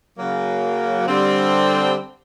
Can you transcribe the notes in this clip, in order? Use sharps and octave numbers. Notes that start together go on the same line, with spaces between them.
C#3 F#3 A#3
D3 G3 C4